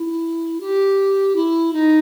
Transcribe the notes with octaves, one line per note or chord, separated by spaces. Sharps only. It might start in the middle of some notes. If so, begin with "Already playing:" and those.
Already playing: E4
G4
E4
D#4